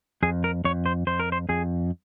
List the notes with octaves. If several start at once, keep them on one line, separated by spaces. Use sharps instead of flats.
F2 G#4
A#4
F2 C#5
C5
F2 C5
A#4
C5
F2 G#4